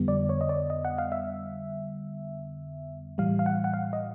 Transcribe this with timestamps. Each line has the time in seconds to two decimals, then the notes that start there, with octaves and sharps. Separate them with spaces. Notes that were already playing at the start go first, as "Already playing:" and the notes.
Already playing: F2 D3 G3 B3
0.08 D5
0.29 C#5
0.41 D#5
0.49 D5
0.70 D#5
0.85 F#5
0.98 F5
1.12 E5
3.18 A2 E3 G3 F5
3.39 F5
3.46 F#5
3.64 F#5
3.74 F5
3.93 D#5